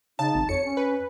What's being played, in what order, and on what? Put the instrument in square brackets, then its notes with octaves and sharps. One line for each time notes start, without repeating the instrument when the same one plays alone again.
[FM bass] C#3 [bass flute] D#4 [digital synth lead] A5
[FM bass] G#1
[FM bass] F2 [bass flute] C#5 [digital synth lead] C#7
[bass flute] C#4
[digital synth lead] B4